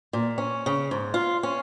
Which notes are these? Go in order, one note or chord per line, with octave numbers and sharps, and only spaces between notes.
A#2
C#4
C#3
G#2
F4
C#4